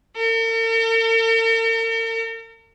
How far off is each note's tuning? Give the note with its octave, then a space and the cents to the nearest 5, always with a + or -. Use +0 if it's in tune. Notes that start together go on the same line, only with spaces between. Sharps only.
A#4 -45